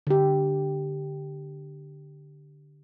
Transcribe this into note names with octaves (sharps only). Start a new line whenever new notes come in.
D3 G4